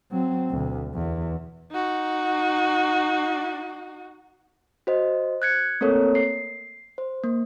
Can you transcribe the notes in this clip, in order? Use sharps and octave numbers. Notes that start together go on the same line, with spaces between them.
F#3 C4
D2 B2
E2
D#4 F#4
F#4 C5 D#5
F#6 G#6 C#7
A3 A#3 C4 A4 A#4 C#5
C7
C5
A#3